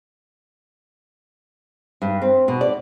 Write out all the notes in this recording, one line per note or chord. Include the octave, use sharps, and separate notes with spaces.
G2
C4
B2
D5